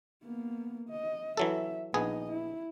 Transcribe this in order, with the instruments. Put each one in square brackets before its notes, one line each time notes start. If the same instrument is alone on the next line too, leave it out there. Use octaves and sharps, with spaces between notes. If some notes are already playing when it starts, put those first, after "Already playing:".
[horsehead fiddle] A#3 B3
D#5
[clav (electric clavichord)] E3 F#3 A4 [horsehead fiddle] E5
[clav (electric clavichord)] A#1 B3 G#4 [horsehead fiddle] D#4 D#5
[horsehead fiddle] E4